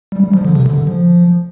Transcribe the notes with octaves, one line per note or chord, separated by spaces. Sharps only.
G3
G3
F3
D3
C3
D3
D3
F3